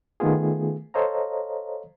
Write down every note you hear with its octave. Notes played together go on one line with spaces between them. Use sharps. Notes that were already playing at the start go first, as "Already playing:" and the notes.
D#3 A3 B3 F4 G#4
A4 C5 C#5 D#5 F5 A#5